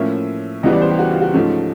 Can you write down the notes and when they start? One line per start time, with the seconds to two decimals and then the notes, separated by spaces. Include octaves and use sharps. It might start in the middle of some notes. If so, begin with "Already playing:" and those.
Already playing: A2 F3 A#3 C#4 E5
0.63 C#2 C#3 E3 G3 B3 D#5
0.73 D5
0.81 C5
0.90 G4
0.99 F#4
1.11 F4
1.22 F#4
1.34 G#2 F3 A3 C#4